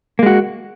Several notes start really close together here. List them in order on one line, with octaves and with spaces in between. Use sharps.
A#3 G#3 F#4